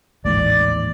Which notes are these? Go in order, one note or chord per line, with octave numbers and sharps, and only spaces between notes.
A1 D#2 G#2 D5